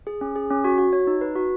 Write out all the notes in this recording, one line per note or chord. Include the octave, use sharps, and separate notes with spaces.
G#4
C#4
G#4
C#4
F#4
F#4
C#5
D#4
B4
F#4